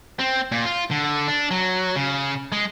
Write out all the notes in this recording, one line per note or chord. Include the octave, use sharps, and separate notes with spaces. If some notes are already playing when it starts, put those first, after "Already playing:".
C4
A#2
F4
D3
D4
F#3
C#3
G#3